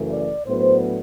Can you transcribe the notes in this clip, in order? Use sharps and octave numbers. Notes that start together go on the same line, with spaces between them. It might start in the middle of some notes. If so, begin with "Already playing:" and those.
Already playing: F#2 C#3 E3 A3
D5
A2 F#3 B3 D4 C5